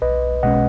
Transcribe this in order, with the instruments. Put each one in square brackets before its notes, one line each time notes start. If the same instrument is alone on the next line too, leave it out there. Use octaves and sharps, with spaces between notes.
[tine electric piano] B1 B4 D#5
B2 G#3 C#4 D#5 F#5